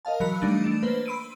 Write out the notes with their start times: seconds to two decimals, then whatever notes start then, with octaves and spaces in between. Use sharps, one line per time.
0.05 A#4 D#5 F5 A5
0.20 E3 F#3 A#4 B5 F#6 C#7
0.41 E3 G3 A3 D4 D#4
0.64 A3 D4 E7
0.82 A#3 B4 C5
1.06 B5 C6 E6 D7 D#7